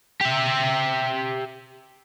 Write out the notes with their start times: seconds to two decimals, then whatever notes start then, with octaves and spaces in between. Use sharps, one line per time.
0.21 G4 E5